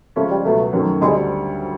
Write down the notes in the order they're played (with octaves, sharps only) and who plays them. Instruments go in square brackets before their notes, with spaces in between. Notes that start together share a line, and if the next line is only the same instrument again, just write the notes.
[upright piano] C#3 F3 G#3 C#4 F4 [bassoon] A3
[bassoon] G3
[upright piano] C#2 B2 F#3 B3 [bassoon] A3
[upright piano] F#2 D#3 F#3 A3 C#4
[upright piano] D2 D3 G3 C4 [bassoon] G#3